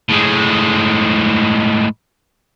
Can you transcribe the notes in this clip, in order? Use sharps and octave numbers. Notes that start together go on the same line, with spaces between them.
A2 G#3